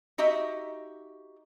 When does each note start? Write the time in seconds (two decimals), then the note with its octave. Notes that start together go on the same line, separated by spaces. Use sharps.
0.18 D#4 F#4 G4 D#5 E5